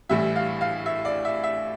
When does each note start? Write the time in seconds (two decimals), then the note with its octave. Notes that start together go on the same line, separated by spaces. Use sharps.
0.09 A1 A2 E3 G3 E5
0.36 F5
0.61 F5
0.86 E5
1.05 D5
1.25 E5
1.44 E5